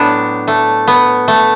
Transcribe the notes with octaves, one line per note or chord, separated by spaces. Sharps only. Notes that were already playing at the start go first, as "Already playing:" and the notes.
Already playing: A2 F#3 A3 B3 D4
A3
B3
A3